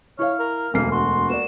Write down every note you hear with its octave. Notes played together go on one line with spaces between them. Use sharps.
E4 C#5 F5 F6
A#4
E1 D2 A#3 C7
F#4 C6
A#3 D5 E7